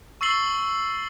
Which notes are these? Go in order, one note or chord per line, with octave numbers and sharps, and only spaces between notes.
C#6 E6 A6 C7 F#7 G7